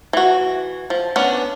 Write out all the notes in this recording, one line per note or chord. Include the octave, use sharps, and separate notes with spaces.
E3 F#4
F3
B3 C#4 D4